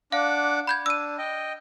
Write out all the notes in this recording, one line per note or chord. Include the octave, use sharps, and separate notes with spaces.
D4 F5 F#5 D6
B5 G6 G#6
D4 E6 D#7
D#5 G5